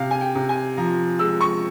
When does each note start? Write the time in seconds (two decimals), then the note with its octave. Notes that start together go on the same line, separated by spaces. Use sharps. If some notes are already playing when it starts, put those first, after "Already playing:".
Already playing: C3 F5
0.11 G#5
0.21 G5
0.35 C3
0.49 G#5
0.77 F3 A#5
1.19 G#3 E6
1.41 C#6